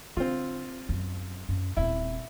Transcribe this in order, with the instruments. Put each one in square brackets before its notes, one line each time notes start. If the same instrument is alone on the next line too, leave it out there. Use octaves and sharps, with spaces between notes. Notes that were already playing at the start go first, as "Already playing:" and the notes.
[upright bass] D3 [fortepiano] C4 F4
[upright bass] F#2
F#2
[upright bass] D#1 C4 [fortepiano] E4